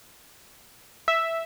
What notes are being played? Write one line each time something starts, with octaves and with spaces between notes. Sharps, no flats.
E5